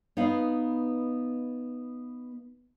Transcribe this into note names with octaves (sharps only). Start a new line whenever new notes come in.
B3 D#4 B4 F5